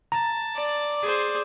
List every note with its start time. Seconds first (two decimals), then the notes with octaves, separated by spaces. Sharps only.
0.12 A5 A#5
0.56 D5
1.02 G#4 C5